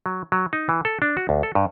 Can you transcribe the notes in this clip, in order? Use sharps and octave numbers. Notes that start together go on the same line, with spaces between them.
F#3
F#3
D#4
E3
A4
D4
F#4
D2
A4
G2